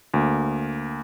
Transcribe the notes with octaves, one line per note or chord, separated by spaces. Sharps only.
D2 A#3